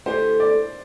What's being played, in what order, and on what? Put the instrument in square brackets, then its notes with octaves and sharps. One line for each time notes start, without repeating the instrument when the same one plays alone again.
[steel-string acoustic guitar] D3 A3 E4 G4 [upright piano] C5
[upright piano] D5